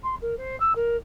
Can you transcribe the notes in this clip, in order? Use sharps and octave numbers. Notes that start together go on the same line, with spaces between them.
C6
A#4
C5
E6
A#4